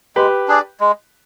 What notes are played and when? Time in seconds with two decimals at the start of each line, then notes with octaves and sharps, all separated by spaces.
0.16 G#3 G4 B4
0.48 D4 G#4 D5
0.80 G#3